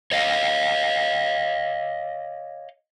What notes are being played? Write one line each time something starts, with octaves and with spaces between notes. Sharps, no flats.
C#5 D#5 F5